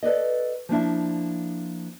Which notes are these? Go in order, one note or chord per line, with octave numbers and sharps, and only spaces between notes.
A4 B4 D5 D#5
F3 A#3 D4 E4